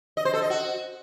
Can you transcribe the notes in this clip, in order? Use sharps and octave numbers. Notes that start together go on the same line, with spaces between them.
D#5
C5
A4
D#5
F#4